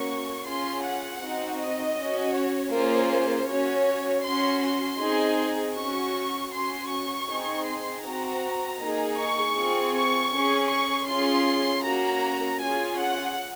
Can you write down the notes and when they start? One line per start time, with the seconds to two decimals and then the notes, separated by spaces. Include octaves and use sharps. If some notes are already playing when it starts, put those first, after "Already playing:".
Already playing: A#3 C#4 F#4 C#6
0.45 C#4 F4 G#4 C6
0.83 F#5
1.21 C4 D#4 F#4
1.59 D#5
1.97 C#4 F#4
2.34 C#5
2.73 A#3 C#4 F4 G#4 C5
3.49 C#4 F#4 C#5
4.24 C#4 F#4 C6
4.63 C6
5.01 C4 D#4 G#4
5.76 C#4 F#4 C#6
6.52 C#4 C6
6.58 F#4
6.90 C#6
7.29 C4 D#4 G#4
7.66 C6
8.05 C4 F#4 A#5
8.80 A#3 D#4 G#4
9.18 C#6
9.56 C4 F4 G#4
9.95 C#6
10.33 C#4 G#4
10.70 C#6
11.08 C#4 F4 G#4 C6
11.84 A#3 C#4 F#4 A#5
12.60 C#4 F4 G#4 G#5
12.98 F#5